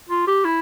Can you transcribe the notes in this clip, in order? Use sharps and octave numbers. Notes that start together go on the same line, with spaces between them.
F4
G4
E4